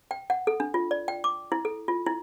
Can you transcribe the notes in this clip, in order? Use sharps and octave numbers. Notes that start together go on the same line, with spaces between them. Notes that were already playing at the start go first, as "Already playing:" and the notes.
G5
F#5
A4
D4
F4
D5
G5
D6
E4
A4
F4
E4